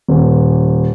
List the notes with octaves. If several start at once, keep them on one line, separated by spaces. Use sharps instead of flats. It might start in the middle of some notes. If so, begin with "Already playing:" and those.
D#1